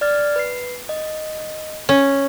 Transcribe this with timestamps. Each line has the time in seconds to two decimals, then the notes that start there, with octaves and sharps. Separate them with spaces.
0.01 D5 F6 A6
0.36 B4 C7
0.89 D#5
1.89 C#4